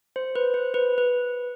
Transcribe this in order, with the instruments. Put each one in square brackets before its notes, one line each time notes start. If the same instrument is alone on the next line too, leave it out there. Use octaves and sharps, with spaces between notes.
[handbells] C5
B4
C5
B4
B4